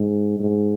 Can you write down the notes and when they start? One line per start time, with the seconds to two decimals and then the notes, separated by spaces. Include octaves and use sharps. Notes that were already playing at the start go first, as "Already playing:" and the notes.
Already playing: G#2
0.39 G#2